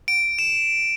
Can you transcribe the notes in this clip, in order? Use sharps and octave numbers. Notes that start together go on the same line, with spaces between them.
D7
E7